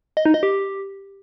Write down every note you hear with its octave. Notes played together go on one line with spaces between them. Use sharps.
D#5
D#4
D#5
G4